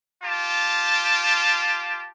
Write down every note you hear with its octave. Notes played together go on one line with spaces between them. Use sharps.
F4 G4 A5